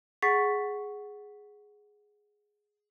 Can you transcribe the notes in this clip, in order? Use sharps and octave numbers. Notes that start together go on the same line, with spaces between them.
G#4 F#5 C#6 A6 B6 C7